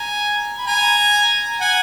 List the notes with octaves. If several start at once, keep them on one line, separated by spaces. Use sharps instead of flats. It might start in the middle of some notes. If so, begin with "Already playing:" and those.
Already playing: G#5 A#5
B5
G#5 A#5
F#5 G#5